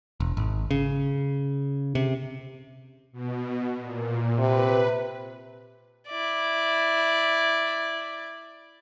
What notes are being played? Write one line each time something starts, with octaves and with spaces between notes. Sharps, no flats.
E1
G#1
C#3
C3
B2
A#2
C3 B4
E4 D5